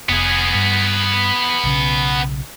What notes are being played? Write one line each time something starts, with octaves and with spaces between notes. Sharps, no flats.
F1 B3 G#4
G2
B1 C#3